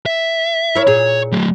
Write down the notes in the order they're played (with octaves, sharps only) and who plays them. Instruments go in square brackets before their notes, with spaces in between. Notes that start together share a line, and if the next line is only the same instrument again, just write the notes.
[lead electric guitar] E5
[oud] E4 A#4 C#5
[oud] A#2 G#4 [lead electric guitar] C#5
[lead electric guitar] F#3 A3